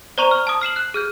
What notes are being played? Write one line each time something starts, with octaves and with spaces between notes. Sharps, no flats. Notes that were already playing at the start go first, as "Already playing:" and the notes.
C5 D5 A#5 C#6 D#7 F7
F6
A5 D#6
F6 C7 E7 F#7
F#6
G#4 F6 G6